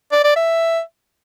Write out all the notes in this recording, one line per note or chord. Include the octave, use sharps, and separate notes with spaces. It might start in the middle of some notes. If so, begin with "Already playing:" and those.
D5
D5
E5